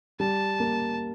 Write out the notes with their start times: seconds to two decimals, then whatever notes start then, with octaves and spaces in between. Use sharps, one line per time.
0.20 G3 A5
0.60 A#3